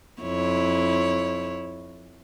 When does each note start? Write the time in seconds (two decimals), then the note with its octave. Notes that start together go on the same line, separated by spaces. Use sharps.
0.22 F2 E4 C#5